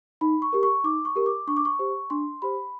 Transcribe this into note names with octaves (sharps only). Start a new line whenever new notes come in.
D#4 B5
C#6
G4 A#4
C#6
D#4 D6
C#6
G4 A#4
D6
D4 C#6
D6
C#6
G4 C5
D4 C6
G4 C5 B5